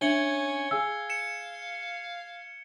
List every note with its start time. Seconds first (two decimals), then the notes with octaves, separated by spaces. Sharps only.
0.01 C#4 D4 E5 G#6 C#7 F#7 G7
0.71 G#4 F5 G#5 E6
1.10 C#7 E7